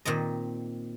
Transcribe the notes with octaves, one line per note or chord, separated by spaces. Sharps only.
A#2 D#3 C4 D#5